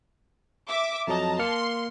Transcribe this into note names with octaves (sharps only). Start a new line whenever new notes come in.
E5 D6
F2 F#3 D#5 A5 A#5
A#3 C6 F6 C#7